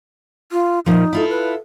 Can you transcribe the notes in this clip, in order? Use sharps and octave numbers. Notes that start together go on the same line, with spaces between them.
F4
A#2 F3 D#4
E4 F4 A4
B4